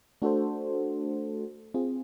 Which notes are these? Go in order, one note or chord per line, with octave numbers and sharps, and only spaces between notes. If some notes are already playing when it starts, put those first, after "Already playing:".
A3 D4 F#4 A4 C5
C4 F4 G#4